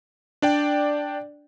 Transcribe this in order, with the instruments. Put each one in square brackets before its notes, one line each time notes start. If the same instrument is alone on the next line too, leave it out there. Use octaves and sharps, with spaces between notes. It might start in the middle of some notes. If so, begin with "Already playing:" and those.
[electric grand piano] D4 D5 G5